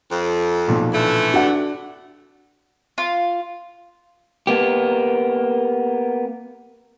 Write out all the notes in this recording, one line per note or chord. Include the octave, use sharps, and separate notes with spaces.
F2
B1 A#2 F3
D3 E3 A3
D4 F#4 F#5
F4
A#3 B3 G4